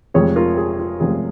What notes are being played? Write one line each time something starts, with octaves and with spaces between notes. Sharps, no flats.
F1 F2 F3 G#3 G#4 C#5
F4 A#4
G#4
F4
F1 F2 F3 G#3 G#4